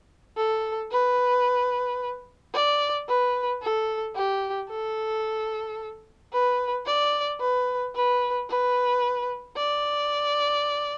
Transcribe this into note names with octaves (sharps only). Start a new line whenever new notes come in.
A4
B4
D5
B4
A4
G4
A4
B4
D5
B4
B4
B4
D5